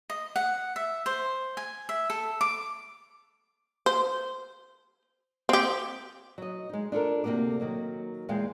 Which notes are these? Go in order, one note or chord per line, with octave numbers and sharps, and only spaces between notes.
D#5
F#5
E5
C5
G#5
E5
A4
D6
C5
C4 G4
F#3 D#5
G#3 D#4
D4 F4 A4 A#4
D2 C3 F3 A#3 F#4 D5
D#3 F#3 A#3
E2 A#2 G#3 F5 G5